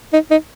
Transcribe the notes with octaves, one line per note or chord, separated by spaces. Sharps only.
D#4
D#4